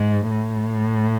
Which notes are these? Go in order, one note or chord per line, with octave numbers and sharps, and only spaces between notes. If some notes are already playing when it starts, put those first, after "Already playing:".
Already playing: G#2
A2